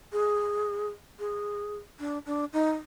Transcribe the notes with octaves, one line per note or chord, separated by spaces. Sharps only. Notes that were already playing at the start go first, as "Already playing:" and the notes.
G#4
G#4
D4
D4
D#4